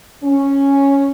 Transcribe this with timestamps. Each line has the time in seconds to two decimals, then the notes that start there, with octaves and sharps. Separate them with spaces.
0.23 C#4